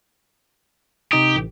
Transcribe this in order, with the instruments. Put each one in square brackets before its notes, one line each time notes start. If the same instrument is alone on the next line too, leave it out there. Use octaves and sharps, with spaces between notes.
[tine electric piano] C3 D#4 D#6 [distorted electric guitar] G4
[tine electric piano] A1